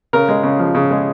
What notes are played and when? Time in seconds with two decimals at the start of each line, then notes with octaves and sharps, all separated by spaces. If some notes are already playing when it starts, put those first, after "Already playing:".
0.13 C#3 A#4
0.28 G#3
0.43 C#3
0.59 F3
0.75 C#3
0.91 G#3